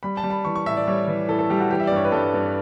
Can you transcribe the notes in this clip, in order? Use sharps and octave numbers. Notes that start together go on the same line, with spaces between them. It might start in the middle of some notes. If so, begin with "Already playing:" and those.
G3 B5
A5
G3
B5
E3 C#6
C#6
A2 E5
D5
G3 C#5
E3
A2 A4
A4
G3 G4
F#4
E3 G4
E5
D5
G2 C#5
B4
G2 A4
G2